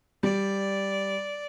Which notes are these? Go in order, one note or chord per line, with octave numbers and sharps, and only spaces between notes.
G3 D5